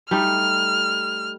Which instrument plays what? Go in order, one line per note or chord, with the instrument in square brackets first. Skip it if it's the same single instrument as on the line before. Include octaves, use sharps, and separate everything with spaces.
[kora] G3 A3 D#4 [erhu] F6